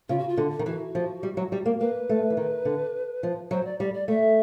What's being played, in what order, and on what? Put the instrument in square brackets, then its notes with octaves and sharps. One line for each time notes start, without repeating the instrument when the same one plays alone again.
[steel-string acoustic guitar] C#3 [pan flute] F4
[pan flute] F#4
F4
[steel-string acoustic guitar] D3
D#3
[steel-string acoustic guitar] E3 [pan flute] F#4
[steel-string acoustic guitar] F3
G3
F#3
G3
A#3
[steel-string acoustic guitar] A#3 [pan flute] B4
[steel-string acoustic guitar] A3
E3
D#3
D3
F3
[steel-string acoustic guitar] F#3 [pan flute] C5
[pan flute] D5
[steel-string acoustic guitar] G3 [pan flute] D5
[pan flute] D5
[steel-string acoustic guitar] A3 [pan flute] E5